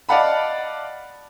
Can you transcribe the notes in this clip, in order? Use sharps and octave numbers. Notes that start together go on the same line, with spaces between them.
D5 D#5 F5 F#5 A5 B5